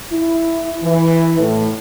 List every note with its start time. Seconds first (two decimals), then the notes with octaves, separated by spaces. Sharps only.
0.12 E4
0.83 E3
1.39 A2